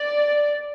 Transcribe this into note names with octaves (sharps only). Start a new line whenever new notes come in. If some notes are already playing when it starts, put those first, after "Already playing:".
Already playing: D5